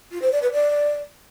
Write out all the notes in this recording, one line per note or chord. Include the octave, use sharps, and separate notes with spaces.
F4
C5
D5
B4
D5